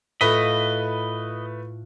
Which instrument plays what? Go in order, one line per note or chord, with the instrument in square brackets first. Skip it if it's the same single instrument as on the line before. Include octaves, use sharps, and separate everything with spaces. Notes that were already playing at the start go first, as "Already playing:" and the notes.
[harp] A2 F4 [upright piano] A3 B4 B6 [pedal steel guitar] D#5